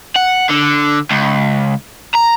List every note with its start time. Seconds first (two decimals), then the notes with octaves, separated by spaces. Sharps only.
0.16 F#5
0.50 D3
1.11 C#2
2.14 A#5